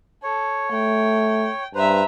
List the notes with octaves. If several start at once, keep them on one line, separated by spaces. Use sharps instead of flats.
A4 C#5
A3 G5
G2 B4 C5 E5 A#5